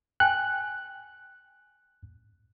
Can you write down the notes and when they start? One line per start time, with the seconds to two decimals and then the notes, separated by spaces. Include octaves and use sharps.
0.20 G5 G#5 F#6